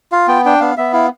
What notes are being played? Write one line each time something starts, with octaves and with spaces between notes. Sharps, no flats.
F4 F5
B3 G5
D4 G5
B3 F5
B3 E5
E4 F5